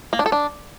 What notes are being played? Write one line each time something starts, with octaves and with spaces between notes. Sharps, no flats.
A#3
D4
A4
D4